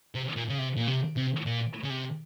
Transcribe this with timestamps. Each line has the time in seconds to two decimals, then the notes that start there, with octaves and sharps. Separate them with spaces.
0.15 C3
0.36 A#2
0.49 C#3
0.58 C3
0.76 A#2
0.88 C3
1.17 C3
1.46 A#2
1.85 C#3
1.90 C3